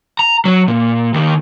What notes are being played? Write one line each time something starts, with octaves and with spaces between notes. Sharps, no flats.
A#5
F#3
A#2
D#2 D#3